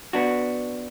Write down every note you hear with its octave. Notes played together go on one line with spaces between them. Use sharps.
B3 D4 F#4